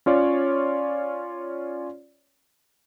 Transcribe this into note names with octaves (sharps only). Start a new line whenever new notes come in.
C#4 F4 C#5 D5